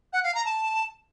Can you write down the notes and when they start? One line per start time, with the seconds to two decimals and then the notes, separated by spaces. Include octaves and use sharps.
0.13 F#5
0.24 F5
0.35 A#5
0.46 A5